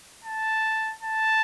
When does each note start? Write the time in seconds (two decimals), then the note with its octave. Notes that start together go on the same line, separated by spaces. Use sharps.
0.24 A5
1.02 A5